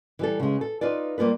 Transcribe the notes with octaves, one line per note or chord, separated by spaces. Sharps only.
E3 G3 A4
C#3 G#3
A4
D#4 F4 B4 D5
G3 A#3 F4 B4